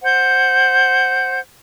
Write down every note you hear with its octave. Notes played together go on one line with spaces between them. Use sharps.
C5 F#5 G6